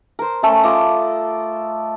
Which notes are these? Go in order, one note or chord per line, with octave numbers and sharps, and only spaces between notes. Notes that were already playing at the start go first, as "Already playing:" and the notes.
A#4 C5
A3 C#4 A4
F4 D5 D#5